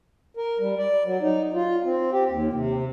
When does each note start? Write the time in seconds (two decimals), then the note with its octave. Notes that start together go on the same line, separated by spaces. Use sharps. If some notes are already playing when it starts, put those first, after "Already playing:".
0.37 A#4
0.59 G3
0.78 D5
1.05 F#3
1.22 D#4
1.54 F4
1.85 C4
2.12 G4
2.29 D#2
2.53 C3